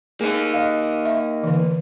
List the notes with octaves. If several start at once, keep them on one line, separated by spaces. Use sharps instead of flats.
A#3 D#4 G#4
D#5 F5
E5
D3 E3